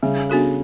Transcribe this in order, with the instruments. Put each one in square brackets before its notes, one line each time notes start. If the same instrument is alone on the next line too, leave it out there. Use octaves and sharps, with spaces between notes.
[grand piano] C#3 [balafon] G3
[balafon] B3 D4 F#4 A4